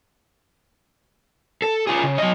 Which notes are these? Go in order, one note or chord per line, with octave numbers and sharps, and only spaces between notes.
A4
F4 G#4
C#3
F#3 D#5